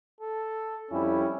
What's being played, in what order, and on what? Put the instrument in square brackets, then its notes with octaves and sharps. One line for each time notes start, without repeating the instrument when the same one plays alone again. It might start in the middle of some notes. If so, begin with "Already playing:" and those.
[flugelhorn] A4
[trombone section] F2 G3 E4 [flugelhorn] C#4